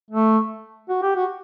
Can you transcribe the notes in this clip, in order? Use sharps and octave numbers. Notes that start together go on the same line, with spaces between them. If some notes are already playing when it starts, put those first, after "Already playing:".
A3
F#4
G4
F#4